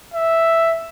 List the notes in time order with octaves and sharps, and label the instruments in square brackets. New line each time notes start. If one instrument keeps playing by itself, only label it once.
[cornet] E5